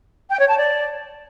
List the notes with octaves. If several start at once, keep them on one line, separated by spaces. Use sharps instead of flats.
G5
C#5
A5
D5